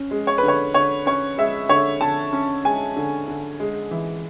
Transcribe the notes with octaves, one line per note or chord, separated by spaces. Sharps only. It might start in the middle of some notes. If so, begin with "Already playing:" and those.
Already playing: C#4
G#3
C#5
D3 B4
C#5
D3 C#5
C#4 C#5
G#3 E5
D3 C#5
D3 A5
C#4
G#3 G#5
D3
D3
G#3
E3